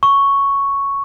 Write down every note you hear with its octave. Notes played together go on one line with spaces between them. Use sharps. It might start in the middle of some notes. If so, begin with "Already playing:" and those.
C#6